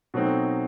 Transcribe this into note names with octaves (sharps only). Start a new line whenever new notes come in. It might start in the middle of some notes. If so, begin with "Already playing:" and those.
B2 F#3 A3 C4 D#4